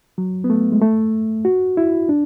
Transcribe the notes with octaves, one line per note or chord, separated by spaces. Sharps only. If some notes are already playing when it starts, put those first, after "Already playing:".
F#3
B3
A3
G#3
A3
F#4
E4
D4